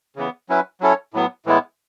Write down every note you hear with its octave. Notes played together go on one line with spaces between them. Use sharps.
C#3 E3 B3
F#3 C#4 E4 B4
F#3 C#4 E4 A4 C#5
A2 F#3 B3
A2 E3 G#3 B3 E4